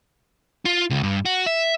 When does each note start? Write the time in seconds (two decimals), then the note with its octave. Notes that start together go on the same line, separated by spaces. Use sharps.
0.65 F4
0.90 C#2
1.03 G2
1.26 F#4
1.47 E5